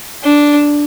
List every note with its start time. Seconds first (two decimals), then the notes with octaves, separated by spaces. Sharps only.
0.24 D4